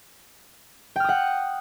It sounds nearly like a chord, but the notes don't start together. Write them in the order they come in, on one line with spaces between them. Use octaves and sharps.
G5 F6 D#6 F#5